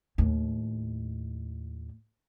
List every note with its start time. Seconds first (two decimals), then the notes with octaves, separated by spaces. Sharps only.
0.18 D#2 A2